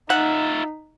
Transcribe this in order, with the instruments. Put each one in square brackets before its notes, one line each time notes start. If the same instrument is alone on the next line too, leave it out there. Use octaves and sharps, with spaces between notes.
[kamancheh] D#4 [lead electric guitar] F4 E5 [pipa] F#5